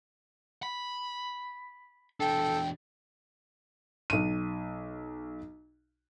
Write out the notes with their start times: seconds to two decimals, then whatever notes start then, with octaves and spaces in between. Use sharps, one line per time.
0.63 B5
2.20 E2 D4 A4 G5
4.10 B1 D#7